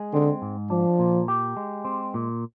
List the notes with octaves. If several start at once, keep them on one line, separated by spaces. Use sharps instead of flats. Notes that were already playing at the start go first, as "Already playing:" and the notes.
Already playing: G#3 G#4
D3 C4
G#2
F3 D4
A#2
G4
G#3
C4
A#2